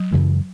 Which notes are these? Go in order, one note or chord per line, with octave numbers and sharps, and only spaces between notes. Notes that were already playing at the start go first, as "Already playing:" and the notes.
Already playing: F#3
F#2 C#3 E3 G#3